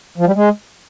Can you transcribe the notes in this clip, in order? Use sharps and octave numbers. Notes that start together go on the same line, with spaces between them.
F3
G3
G#3